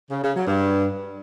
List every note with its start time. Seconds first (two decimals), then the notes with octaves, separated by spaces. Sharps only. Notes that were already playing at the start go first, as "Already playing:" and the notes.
0.10 C#3
0.22 C#3
0.34 F#3
0.46 G2